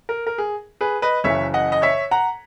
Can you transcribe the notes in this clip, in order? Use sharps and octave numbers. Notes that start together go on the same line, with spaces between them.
A#4
A#4
G#4
G#4 B4
B4 D#5
F#1 F#2 C#3 E3 C#5 E5
D#5 F#5
D#5
C#5 E5
F#5 A#5